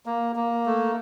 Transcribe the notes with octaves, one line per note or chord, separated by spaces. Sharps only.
A#3
A#3
A3